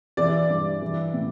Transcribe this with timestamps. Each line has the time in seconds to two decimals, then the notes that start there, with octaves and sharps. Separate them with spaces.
0.17 E3 D5
0.50 G2
0.82 E3
1.14 A2